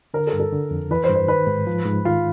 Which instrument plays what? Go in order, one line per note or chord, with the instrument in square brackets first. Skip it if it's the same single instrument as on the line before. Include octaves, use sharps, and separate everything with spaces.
[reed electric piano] D3 [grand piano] A#4
[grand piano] A4
[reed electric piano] G2
[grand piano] A4
[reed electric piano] D3
F2
[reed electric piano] E3 [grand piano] B4
[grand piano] C5
[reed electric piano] G2
[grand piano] C5
[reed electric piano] D#3 [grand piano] B4
[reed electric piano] G#2
F3
G#2
[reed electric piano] D#3 [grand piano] F4